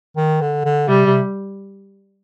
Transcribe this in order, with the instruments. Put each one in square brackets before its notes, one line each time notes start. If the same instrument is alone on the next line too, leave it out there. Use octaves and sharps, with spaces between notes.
[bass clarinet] D#3
D3
D3
[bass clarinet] C3 [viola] G3
[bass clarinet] C3